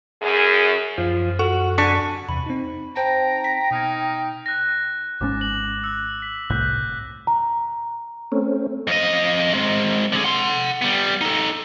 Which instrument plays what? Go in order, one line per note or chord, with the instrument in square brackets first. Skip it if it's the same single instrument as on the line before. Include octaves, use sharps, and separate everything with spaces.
[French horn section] F#2 G#4
[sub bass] F#2 [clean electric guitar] F3
[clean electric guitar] F#4 [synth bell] A4
[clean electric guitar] D3 [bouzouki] D4 F#4 G#5 [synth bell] C#6 B6 C#7
[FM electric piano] E2 C3 [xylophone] B5
[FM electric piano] C4 D#4
[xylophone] C5 A5 [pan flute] G5 [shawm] A#5
[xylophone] B6
[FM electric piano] B2 F6 G#6 [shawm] D#4
[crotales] F#6 A#6
[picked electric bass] G#1 G#2 C#4 [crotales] D6 A6
[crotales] F#7
E6 F#6
B6
[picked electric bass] G1 C2 A2 [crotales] F#6 G6 B6
[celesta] A#5
[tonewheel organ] A3 C4 C#4
[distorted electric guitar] F2 D#5
G#3 C4
D3 G#4
F#5 C6
G3 B3
D#4 A4